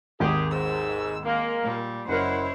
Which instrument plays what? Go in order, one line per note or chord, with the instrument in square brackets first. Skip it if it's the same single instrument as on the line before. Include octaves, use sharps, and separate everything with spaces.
[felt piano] G#1 D#2 [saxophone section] G4 G#4
[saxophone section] G#2 [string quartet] E6
[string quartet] G#3 [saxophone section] A#3
[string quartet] A#2 G3
[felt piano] F#1 A#4 [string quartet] E4 C5 C#5 [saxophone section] F#5